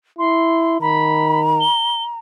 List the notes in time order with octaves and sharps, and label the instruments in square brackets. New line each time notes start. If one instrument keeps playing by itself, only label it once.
[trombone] E4 [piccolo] C6
[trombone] D#3 [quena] A#5 [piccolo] B5
[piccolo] G7